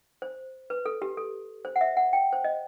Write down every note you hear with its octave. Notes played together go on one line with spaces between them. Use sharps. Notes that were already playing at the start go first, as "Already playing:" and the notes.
C5
B4
A4
G4
A4
C5
F#5
E5
F#5
G5
C5
D#5